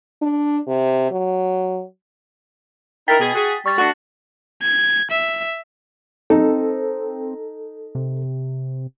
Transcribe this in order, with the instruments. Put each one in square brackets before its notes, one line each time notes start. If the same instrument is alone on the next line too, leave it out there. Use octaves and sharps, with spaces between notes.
[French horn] D4
C3
F#3
[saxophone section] D#4 E4 A#4 [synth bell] G5 A6 B6
[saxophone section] B2 G#4
F#4 G#4
[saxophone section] G3 [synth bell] C#6 A6
[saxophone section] A3 D4 F#4
[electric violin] G#6
E5
[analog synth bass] C4 [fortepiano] D#4 [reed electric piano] A4
[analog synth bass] C3